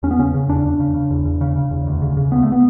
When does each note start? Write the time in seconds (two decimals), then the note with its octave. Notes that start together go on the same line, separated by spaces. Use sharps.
0.03 E2 C#4
0.11 B3
0.19 C#3 C#4
0.34 C#3
0.49 E2 D4
0.65 E2
0.80 C#3
0.94 C#3
1.11 E2
1.25 E2
1.41 C#3
1.56 C#3
1.71 E2
1.87 D2
2.02 C#3
2.17 C#3
2.32 D2 B3
2.43 A3
2.52 B3